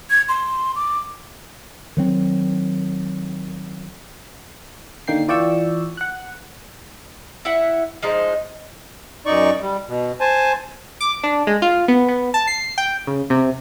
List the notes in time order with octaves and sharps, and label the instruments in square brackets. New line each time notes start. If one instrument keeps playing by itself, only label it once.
[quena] G#6
C6
D6
[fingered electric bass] D#3 F#3 C4
[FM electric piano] D3 D#3 A#3 G5 C7
E3 F4 D5 G5 C#6 E6
F#5 F#6
[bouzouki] E4 E5 F#5
F3 G#3 D#4 C5
[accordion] F#2 D#4 D5 C#6
G3
B2
C5 G#5 A5
[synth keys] D6
D4
G#3
F4
B3
B3
A5
C7
G5
C#3
C3